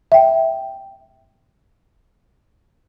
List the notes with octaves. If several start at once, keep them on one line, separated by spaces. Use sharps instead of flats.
E5 G5